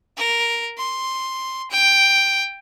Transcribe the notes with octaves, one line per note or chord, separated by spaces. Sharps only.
A#4
C6
G5